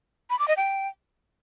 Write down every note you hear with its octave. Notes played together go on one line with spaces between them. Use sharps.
B5
D6
D#5
G5